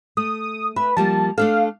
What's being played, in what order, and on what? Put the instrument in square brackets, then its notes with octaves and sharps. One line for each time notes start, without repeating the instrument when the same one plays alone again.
[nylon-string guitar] A3 [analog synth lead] D#6
[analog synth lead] B4 [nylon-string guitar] E5
[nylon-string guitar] F3 G3 A#3 [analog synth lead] A5
[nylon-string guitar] A3 D4 A4 [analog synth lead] F5